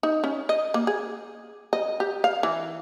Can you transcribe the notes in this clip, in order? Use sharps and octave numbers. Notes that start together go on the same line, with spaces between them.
D#4
C#4
D#5
A#3
G#4
D#5
G4
F5
E3